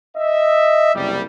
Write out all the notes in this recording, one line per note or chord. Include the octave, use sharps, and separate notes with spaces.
D#5 E5
F#1 C2 G3